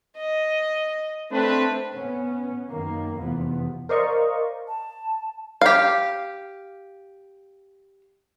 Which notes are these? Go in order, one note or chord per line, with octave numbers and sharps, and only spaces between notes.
D#5
A3 C4 D4 B4
B3 C#4
F#2 D#3 A#3
F1 E2 C3 F3 B3
A#4 C5 D5 D#5 F5 C#6
A5
G4 F5